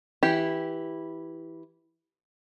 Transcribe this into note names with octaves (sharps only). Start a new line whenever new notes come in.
E3 E4 G4